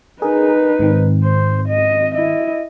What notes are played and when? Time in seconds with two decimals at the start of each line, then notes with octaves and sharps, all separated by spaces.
0.22 D#4 G#4 A#4 B4
0.79 G#2 D#3 C4
1.24 C5
1.68 D#5
2.15 E4 D#5